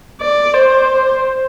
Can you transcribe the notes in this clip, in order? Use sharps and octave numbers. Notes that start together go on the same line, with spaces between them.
D5
C5